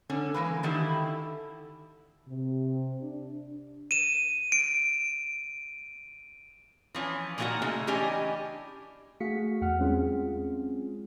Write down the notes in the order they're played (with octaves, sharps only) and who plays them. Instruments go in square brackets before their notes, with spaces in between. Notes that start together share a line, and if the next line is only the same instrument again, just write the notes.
[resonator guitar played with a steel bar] D3 C#4
E3 G#3 A#3 B4
D3 D#3 E4 G4
[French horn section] C3
D4
[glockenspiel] D#7 E7
D7
[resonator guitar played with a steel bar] E3 F3 C#4
A#2 D3 D#3 A#3 F#4 F#5
C#3 G#3 A3 D#4
E3 C#4 D4 G4 D#5
[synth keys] A3 F#4 G#4 F5 B6 C#7
E2 F#5 F6
F#3 G#3 C4 C#4 F4 G#4